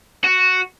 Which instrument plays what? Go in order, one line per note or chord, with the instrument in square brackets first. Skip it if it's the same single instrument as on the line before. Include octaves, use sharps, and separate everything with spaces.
[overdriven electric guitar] F#4